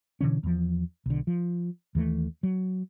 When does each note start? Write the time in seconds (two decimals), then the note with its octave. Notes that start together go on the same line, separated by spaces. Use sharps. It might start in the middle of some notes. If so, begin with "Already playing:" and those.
0.21 B2 D3 E3 C#4
0.43 E2 F3
1.06 B1 D3
1.27 F3
1.95 D#2 E3 G3 A3
2.43 F#3